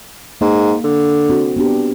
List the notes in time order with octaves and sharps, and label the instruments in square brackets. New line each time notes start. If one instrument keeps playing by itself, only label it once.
[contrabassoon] G#2 [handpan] A#3
[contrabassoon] D3
[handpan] C4 F#4
B3 D4 G4